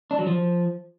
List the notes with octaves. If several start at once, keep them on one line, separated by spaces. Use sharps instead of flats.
D4
F#3
F3